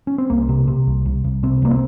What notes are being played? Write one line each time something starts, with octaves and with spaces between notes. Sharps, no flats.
C#4
C4
C2 A#3
C3
C3
C2
C2
C2
C3 C4
C2 A#3
C4